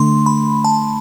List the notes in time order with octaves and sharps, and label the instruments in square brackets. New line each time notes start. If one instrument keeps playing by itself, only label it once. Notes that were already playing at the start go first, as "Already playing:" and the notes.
Already playing: [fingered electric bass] D3 A3 D4 [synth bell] C6
[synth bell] B5
A5